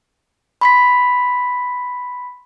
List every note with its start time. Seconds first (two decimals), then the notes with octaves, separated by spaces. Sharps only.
0.61 B5 C6 B6